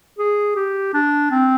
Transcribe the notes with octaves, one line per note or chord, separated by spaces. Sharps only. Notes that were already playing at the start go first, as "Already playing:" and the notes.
G#4
G4
D4
C4